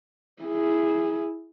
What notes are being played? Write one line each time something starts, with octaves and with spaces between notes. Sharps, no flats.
E4 G#4